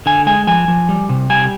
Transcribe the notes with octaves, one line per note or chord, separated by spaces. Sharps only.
D3 G#5
G#3 G#5
F3 G#5
F3
G3
C3
G3 G#5